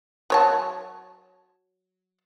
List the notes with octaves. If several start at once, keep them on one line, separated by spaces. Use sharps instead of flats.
F#3 C#5 A5